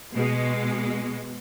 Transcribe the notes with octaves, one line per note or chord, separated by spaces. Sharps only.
B2 G#3